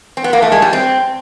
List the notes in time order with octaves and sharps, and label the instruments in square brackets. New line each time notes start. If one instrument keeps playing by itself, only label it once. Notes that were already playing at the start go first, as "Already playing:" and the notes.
[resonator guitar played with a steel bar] C4
B3
A#3
A3
G#3
G3
C4